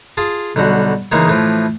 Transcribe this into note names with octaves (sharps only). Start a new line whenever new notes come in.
F4 G#4 A5
B1 D3 G3 F#4
C#3 E3 G#3 A#3 D#4
A2 E3 F3